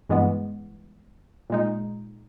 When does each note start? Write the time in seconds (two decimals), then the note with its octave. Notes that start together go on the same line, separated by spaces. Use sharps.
0.09 G2 E3 G#3 B3
1.50 A#2 G#3 D#4